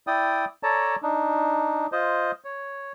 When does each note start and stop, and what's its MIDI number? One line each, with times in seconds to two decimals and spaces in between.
0.07 0.45 64
0.07 0.45 74
0.07 0.45 79
0.07 0.45 87
0.63 0.96 69
0.63 0.96 73
0.63 0.96 74
0.63 0.96 81
0.63 0.96 82
1.02 1.87 62
1.02 1.87 63
1.92 2.31 65
1.92 2.31 72
1.92 2.31 75
2.44 2.92 73